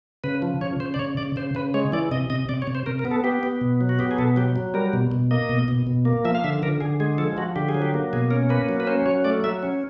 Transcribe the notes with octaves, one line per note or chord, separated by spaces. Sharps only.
C#3 B4
F3
C#3 C#5
C#3 C5
D5
C#3 C#5
C#3 D5
C#3 C5
C#3 B4
G#3 C#5
E3 D5
C3 D#5
C3 D#5
C3 D5
C#5
C3
C5
C3 A#4
A#4
B3
A4
B3 G4
B3
B2
F#3
F#4
B3 G4
G#4
B2 A4
F#3 G4
F#3
G3 A#4
B2
B2
A#3 D#5
B2
B2
B2
A#3
F3 E5
F5
D3 E5
D3 A#4
D3 G#4
G#3 G#4
F3 A4
F3 F#4
D3 G4
G#4
F#3
G4
A#3
B2 G#4
C#4 A#4
A#3 B4
F#3
B4
C#4 C5
F#3 C#5
A3 D5
F#3 E5
C#4